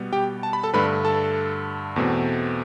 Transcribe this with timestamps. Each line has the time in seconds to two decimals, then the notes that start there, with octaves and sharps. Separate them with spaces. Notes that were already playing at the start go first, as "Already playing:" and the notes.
Already playing: B2 G3 B3
0.13 G4 G5
0.43 A5
0.53 B5
0.63 A4 A5
0.73 G2 D3 A3 D4 B4 B5
1.05 A4 A5
1.96 E2 B2 A3 C4